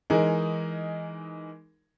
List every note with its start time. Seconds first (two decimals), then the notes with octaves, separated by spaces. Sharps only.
0.10 E3 G#3 D#4 A#4